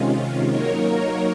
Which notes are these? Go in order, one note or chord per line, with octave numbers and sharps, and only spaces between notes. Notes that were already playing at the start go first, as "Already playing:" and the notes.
Already playing: C3 D#3 G#3 C#4 F4
F#3 A#3 D#4 A#4 C#5